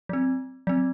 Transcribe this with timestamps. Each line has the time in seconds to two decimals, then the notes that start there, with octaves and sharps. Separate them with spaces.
0.09 F#3 C4
0.67 F#3 C4